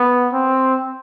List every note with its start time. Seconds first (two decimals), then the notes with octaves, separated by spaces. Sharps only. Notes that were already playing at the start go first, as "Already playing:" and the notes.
Already playing: B3
0.33 C4